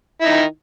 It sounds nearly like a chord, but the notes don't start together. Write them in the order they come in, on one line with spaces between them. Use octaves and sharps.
E4 D#4 D#3